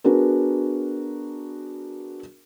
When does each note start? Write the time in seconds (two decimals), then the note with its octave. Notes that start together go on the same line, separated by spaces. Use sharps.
0.04 B3 D4 F#4 G#4 A#4